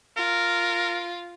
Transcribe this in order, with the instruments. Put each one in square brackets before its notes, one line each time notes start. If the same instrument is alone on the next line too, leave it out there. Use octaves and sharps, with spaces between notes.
[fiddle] F4 [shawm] A#4